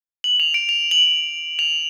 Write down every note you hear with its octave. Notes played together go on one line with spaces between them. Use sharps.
F#7
F7
D7
F7
F#7
F7